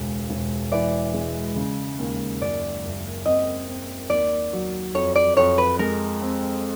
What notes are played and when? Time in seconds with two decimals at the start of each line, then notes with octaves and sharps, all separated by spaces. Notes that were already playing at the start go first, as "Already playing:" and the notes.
Already playing: E1 C#2
0.30 E1
0.72 E3 D5
1.14 G#3
1.56 C#3
1.99 D#2
2.41 F#2 D5
2.84 F#1
3.25 C4 D#5
3.67 C4
4.10 D#2 D5
4.53 F#3
4.95 F2 C#5
5.16 D5
5.37 F2 C#5
5.58 B4
5.79 G#3 A#4
6.22 C4